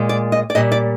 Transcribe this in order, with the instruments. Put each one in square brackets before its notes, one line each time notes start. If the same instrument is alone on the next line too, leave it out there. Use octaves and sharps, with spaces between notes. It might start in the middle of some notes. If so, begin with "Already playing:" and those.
Already playing: [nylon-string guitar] A#2 G#3
D5
D#5
D5
A#2 G3 D#5
D5